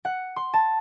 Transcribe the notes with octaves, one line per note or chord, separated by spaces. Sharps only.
F#5
C6
A5